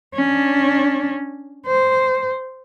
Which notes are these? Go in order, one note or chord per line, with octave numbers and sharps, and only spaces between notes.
C#4 D4
C5